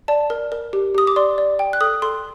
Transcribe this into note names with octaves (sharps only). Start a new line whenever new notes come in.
D5 A5
A#4
A#4
G4
G4 D#6
D6
D5 C6
D5
G5
F#6
A4 D#6
A4 C6